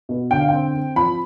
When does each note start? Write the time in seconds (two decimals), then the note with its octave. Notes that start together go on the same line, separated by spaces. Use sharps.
0.09 B2
0.31 D3 G5
0.40 F5
0.48 C4 G5
0.74 C4
0.96 F3 B5